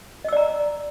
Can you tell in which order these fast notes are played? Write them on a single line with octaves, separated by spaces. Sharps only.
D#5 E6 D5 A#5